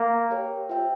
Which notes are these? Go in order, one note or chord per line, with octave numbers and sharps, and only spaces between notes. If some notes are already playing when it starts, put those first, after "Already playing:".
Already playing: A#3
G4 A#4 C#5 G5
F4 C5 E5 G5